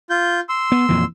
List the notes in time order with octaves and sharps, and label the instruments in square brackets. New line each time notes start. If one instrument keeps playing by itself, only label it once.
[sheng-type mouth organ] F4 G6
C6 E6
[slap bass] B3
F2 A#2 E3